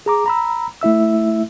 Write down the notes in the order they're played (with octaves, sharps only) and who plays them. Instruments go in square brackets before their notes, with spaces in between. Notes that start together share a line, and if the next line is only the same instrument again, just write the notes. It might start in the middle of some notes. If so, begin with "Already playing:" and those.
[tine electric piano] G#4 A#5 D6
A#5 B5 E6
A3 E4 E5 E6